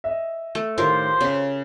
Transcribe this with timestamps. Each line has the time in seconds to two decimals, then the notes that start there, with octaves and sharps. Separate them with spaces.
0.04 D#5 E5
0.55 A3
0.78 A2 D#3 F4 G4 A#4 C5
1.21 C#3 C#5 B6